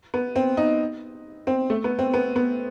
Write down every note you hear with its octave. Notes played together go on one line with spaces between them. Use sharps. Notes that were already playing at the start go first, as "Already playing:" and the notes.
B3
C4
D#4
C4
A3
B3
C4
B3
B3